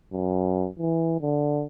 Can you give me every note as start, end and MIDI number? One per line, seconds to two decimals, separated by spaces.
0.13 0.67 42
0.79 1.17 52
1.21 1.65 50